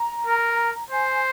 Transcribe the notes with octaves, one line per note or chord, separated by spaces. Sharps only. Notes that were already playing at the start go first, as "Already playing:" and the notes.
Already playing: A#5
A#4
C5 G#5